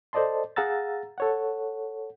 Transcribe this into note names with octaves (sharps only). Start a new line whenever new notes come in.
A4 C5 D5 D#5 A5 C6
G#4 F5 F#5 A#5 E6 A6
A4 C#5 F#5